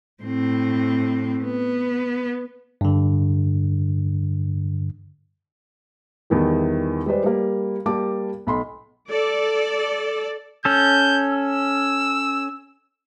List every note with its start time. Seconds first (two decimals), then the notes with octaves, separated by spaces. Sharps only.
0.23 A2 C4
1.44 B3
2.81 G2 D3
6.30 E2 D#3 E3 G3
7.06 G3 G#3 B4 C5 D5
7.24 G3 A#3
7.86 G3 A#3 A5 D6
8.47 B1 B5 C6
9.09 A4 D5
10.65 C#4 A4 G6
11.32 E6